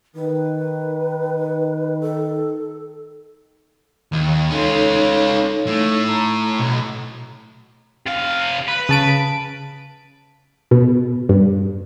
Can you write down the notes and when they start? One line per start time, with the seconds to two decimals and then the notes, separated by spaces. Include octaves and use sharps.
0.15 D#3 B4
2.02 A4
4.13 D#2
4.51 C#4 D#4 F4 A4 C#5
5.67 A2
6.08 A#5
6.59 B1
8.07 C3 F5
8.68 B4
8.89 C#3 A5 D7
10.71 B2
11.29 G2